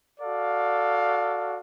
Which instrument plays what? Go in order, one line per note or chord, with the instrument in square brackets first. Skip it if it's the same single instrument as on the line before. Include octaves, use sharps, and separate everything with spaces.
[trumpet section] F#4 A4 D5 F5